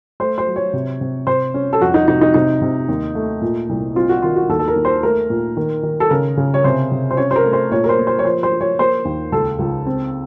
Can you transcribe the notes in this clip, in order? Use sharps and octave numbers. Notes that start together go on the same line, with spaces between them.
A3 C5
C5
F#3
C#5
C3
C3
C3 C5
C#4
A4
F2 F#4
D#4
C3 D#4
D#4
C3 D#4
C3
D#2
A3
A#2
C2
C4 F4
F#4
D#3 F4
F#4
D#2 A4
A4
A#4
D#2
C5
A3 A#4
A#2
D#3
D#3
A4
C#3 A#4
C#3
C#5
C3 C5
C3
C5
C#4 C#5
C5
A#4
A3
C5
A#2 C#5
A#4
C5
A#3
C5
C#5
F3 C5
C5
F3
C#5
A#3 C5
D#2
C#2 A4
C#2
C4